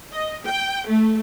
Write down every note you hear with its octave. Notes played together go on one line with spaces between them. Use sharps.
D#5
G5
A3